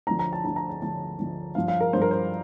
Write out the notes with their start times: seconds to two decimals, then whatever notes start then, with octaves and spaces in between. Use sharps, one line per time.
0.07 D2 D3 F3 A#5
0.19 A#5
0.33 A5
0.44 D2 D3 F3 A#5
0.56 A#5
0.69 A#5
0.81 D2 D3 F3 A5
1.19 D2 D3 F3
1.55 G2 F3 F5
1.68 F5
1.81 A#4
1.93 G2 C5
1.97 F3 A#4
2.11 C5